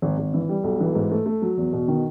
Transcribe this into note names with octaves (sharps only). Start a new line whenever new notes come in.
G#1
G#1
E3
G3
B1
E3
G#2
A3
A3
F#3
E2
B2
D#3